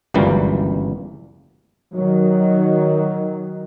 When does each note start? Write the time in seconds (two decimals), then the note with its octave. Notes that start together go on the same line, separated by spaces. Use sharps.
0.14 G1 C#2 F#2 E3 G3 A#3
1.94 D#3 F#3